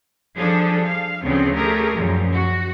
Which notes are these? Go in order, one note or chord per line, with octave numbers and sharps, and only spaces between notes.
F3 G3 D4 G#4 A4
F5
D2 C#3 F3 B3 C4
A3 G4 G#4 A#4
F#2 A#2 F3
F#4